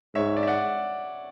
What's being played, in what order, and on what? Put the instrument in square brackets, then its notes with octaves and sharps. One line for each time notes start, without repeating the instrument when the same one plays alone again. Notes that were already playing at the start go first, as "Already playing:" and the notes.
[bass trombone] G#2 [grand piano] C#5 E5
[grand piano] D5
E5
D5 F#5